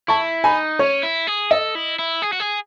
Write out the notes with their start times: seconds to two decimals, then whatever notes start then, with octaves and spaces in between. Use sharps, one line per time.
0.08 E4 A5 C#6
0.44 D#4 G#5 B5
0.79 C#4 C#5
1.03 E4
1.27 G#4
1.51 A4 D#5
1.75 E4
1.99 E4
2.22 G#4
2.33 F#4
2.40 G#4